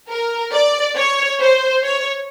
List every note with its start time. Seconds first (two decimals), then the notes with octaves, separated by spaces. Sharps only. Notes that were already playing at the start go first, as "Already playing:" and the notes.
0.10 A#4
0.53 D5
0.96 C#5
1.40 C5
1.84 C#5